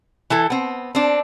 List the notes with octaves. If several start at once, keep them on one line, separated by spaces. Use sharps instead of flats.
E3 E4 A4
B3 C4
C4 D4